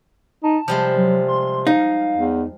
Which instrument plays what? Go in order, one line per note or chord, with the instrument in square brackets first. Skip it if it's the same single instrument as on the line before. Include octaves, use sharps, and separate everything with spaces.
[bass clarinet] D#4 [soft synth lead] A5
[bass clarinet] C3 [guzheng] F3 G3 G#3
[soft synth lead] F#3
C6
[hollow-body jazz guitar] D#4 [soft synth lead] F5
[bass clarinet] E2